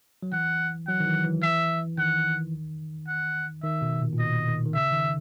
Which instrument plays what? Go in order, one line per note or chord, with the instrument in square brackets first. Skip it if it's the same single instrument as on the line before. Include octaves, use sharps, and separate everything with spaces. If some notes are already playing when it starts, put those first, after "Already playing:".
[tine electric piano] F#3
[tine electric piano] E3 [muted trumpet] F#5
[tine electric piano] F#3 [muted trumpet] F#5
[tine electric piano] D#3
E3
E3
[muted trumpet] E5
[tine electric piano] D#3 [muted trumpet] F#5
[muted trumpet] F#5
[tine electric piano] D#3 [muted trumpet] E5
[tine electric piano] B2
A#2
A#2
[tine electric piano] B2 [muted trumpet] D#5
[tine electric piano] D#3
D#3
[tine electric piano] C#3 [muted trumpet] E5
[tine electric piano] D#3